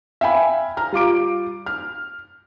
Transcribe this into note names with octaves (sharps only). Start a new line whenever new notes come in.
E5 F5 G5 G#5 B5
A#5 F6
G3 F4 D6 D7
F6